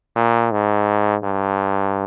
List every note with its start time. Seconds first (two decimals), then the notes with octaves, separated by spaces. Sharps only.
0.16 A#2
0.51 G#2
1.23 G2